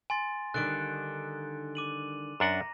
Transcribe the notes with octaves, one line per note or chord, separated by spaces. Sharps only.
G#5 C6 A6
D3 D#3 G3 F#6 A6 D7
D6 D#7 F#7
F#2 D4 F#5 A#5 A#6